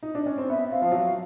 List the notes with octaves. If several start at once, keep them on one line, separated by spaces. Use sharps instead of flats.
D#4
D4
C#4
C4
B3 E5
C4 F5
F3
F#3